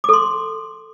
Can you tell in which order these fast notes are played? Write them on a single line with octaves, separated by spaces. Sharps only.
D6 A4 C6